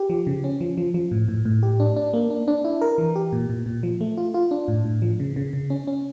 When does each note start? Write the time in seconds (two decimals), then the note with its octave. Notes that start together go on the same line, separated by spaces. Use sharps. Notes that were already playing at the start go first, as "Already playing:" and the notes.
Already playing: G4
0.10 F3
0.27 C#3
0.44 C#4
0.61 F3
0.77 F3
0.94 F3
1.11 A2
1.28 A2
1.45 A2
1.63 G4
1.80 D4
1.96 D4
2.13 A#3
2.30 D4
2.48 D4
2.64 E4
2.81 A#4
2.98 E3
3.15 G4
3.32 A#2
3.50 A#2
3.66 A#2
3.83 F3
4.01 A3
4.17 F4
4.34 F4
4.51 D4
4.68 A2
4.85 A2
5.02 F3
5.20 C#3
5.36 C#3
5.53 C#3
5.70 C#4
5.87 C#4